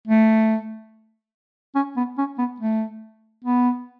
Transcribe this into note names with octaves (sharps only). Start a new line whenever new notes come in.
A3
C#4
B3
C#4
B3
A3
B3